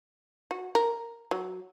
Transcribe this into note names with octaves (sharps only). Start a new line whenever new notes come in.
F#4
A#4
F#3